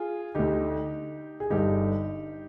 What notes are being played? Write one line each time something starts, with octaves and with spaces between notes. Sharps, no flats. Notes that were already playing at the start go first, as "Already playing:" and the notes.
Already playing: F4 G#4
D2 D3 D#4 G4
G#4
G1 G2 D3 D#4 G4